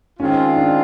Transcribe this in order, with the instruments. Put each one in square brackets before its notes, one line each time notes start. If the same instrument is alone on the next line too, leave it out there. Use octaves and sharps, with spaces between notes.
[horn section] D#3 G#3 C4 F4 [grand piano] C#4
[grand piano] D4